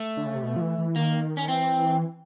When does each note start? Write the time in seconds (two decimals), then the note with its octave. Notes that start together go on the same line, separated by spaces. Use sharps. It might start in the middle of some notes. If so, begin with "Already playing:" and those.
Already playing: A3
0.17 D3
0.26 C#3
0.35 C3
0.43 B2
0.56 F3
0.61 E3
0.78 E3
0.96 D#3 A#3
1.37 C#4
1.48 E3 C4